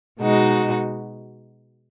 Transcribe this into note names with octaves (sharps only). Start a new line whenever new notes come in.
B2 G#3 D#4 F#4